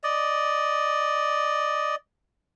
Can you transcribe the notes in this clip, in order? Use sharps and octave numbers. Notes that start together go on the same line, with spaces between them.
D5 D#5